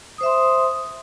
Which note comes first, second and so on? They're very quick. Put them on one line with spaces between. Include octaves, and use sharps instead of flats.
D#6 C5 E5 C6